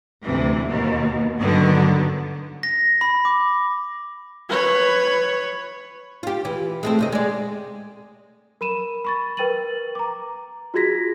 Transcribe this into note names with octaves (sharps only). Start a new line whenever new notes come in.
D2 C3 E3
D#2 B2
G2 D3 D#3 F#3 B3
A#6
B5
D6
B4 C#5
F4 G4
E3
G#3 A3 C4
D2 C3 D#5
G#3 D5
A#4 B5 D#7 E7
B5 C#6 A6
A#4 B4 G5 A6 D#7 F#7
A#5 D6
F4 F#4 G#4 G#6 A#6 B6